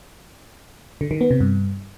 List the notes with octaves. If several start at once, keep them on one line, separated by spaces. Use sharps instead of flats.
D3
D#3
B3
C3
G2